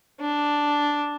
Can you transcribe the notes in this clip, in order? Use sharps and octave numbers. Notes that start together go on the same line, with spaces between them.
D4